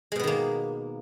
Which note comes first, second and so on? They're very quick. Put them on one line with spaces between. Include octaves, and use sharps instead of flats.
G#3 B2 B3 D#3 A#3